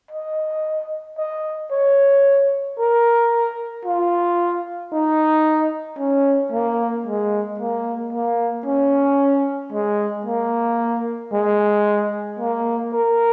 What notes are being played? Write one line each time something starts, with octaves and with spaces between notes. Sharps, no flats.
D#5
D#5
C#5
A#4
F4
D#4
C#4
A#3
G#3
A#3
A#3
C#4
G#3
A#3
G#3
A#3
A#4